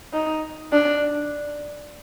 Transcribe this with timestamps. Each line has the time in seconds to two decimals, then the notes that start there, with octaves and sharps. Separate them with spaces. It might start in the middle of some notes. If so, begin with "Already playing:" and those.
0.13 D#4
0.73 D4